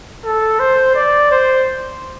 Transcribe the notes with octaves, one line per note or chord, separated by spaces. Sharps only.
A4
C5
D5
C5